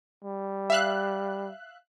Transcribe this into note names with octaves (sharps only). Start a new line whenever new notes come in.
G3
E5 F5 F#6